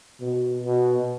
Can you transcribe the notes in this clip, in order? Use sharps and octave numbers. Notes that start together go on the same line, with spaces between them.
B2
B2